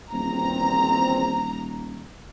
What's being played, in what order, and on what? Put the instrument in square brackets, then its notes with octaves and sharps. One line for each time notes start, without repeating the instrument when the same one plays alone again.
[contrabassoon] D#1 [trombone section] A#1 E2 C4 [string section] A#5